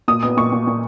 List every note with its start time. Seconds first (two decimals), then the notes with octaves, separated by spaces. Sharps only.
0.08 A#2 D#6
0.23 B3 D#6
0.37 A#2 C#6
0.52 A#2
0.67 A#2